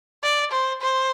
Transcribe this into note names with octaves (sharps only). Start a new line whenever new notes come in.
D5
C5
C5